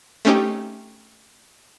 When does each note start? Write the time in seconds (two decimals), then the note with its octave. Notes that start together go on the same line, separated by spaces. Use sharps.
0.25 A3 C4 C#4 D#4 G4